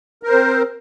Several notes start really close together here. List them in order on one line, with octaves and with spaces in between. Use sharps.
A#4 C5 C4